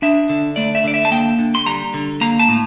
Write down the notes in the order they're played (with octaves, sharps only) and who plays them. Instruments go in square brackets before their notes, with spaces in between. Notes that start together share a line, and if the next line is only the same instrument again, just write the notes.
[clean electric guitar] D4 E5
D3
A3 D5
E5
D3 D5
E5
A5
A#3 G5
D3
C6
G3 A#5
D3
A#3 A#5
A5
A2